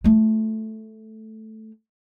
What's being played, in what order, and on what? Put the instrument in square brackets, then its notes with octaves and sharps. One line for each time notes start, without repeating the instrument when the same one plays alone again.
[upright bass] A3 F4